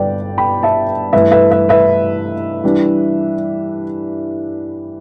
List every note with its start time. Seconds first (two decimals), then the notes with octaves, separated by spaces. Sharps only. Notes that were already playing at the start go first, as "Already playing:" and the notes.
Already playing: G1 G2 G3 B3 B4 D5 G5
0.38 G5 B5
0.63 E5 A5
1.13 G2 E3 A3 B4 E5
1.32 B4 E5
1.51 B4 E5
1.69 B4 E5
2.64 E3 G3 D4